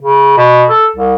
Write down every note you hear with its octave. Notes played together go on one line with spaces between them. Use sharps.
C#3
B2
A4
C2